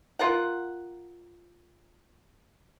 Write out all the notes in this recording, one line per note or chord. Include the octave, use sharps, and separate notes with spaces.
F4 A#4 F#5